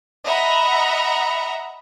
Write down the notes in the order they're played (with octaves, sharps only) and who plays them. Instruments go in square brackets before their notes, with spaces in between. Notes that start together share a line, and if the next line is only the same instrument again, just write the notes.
[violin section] D#5 E5 F#5 A#5 B5